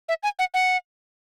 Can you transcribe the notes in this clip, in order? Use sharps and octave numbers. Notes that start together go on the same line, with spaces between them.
E5
G#5
F#5
F#5